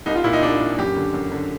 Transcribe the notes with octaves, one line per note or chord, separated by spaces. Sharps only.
C2 D#4
F4
A#2 E4
D#4
C2 D4
A#2
F#2 G4
D3
F#2
D3